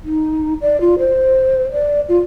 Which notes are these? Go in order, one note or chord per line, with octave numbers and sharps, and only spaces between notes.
D#4
D5
F4
C5
D5
F4